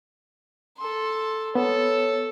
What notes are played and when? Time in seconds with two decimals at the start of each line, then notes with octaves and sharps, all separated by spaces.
0.78 A4 C6
1.55 B3 A4 C#5